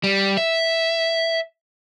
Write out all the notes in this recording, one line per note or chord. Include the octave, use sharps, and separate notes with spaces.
G3
E5